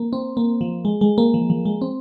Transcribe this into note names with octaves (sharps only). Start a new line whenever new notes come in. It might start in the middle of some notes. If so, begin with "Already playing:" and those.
Already playing: A#3
C4
A#3
F3
G#3
G#3
A#3
F3
F3
G#3
C4